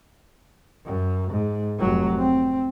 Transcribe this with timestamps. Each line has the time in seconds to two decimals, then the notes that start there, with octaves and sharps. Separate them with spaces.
0.86 F#2
1.31 G#2
1.79 F1 F#3
2.18 C4